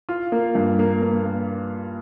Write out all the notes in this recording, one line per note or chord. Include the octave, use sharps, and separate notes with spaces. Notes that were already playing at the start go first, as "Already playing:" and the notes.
F4
A#3
G2
A#3
A#3
A#3